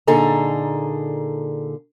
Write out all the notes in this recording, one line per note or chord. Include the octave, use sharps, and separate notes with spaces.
A#2 D3 D#4 G#4 A4 A#5